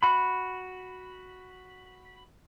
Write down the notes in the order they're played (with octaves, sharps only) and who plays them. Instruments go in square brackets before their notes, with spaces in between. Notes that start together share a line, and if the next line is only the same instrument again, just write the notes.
[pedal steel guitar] F#4 B5